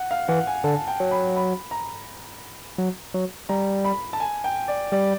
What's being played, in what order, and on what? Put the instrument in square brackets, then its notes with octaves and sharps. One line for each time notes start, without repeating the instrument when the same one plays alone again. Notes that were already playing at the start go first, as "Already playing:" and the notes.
Already playing: [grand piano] F#5
F5
[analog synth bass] E3 [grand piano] F#5
[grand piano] G#5
[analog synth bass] D3 [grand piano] A5
[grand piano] G5
[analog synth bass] F#3
[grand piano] B5
B5
A#5
[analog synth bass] F#3
F#3
[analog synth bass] G3 [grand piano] A#5
[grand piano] B5
A5
G#5
G5
D5
[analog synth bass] G3 [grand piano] D5